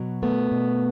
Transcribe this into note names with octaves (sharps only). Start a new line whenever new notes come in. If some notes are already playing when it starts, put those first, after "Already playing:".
Already playing: B2 F#3
A3 B3
B2